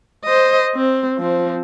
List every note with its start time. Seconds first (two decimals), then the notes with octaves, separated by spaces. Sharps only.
0.24 C5 D#5
0.75 C4
1.18 F3 C4